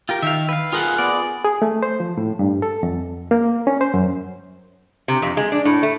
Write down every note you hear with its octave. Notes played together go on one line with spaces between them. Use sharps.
F4 G4 A#4
D#3 E5 F5
B4 F5
F4 G#4 A#4 F#5
B3 D5
G#4
A3
C5
F3
A2
G2
A4
F2
A#3
C#4
C5
F#2
C3
F2
G#3
D4
A2
A3